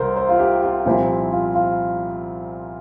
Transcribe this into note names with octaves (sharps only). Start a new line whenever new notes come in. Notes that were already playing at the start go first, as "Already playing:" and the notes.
Already playing: C2 C3 E3 A#4 C5
C5
F4
G4
F4
C2 A#2 F3 C4 E4
F4
F4